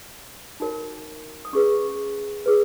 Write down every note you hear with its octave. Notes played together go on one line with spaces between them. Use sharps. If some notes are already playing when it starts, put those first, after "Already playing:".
D#4 F#4 A#4 C#5
D#6
C#4 G#4 B4 C#6
G#4 B4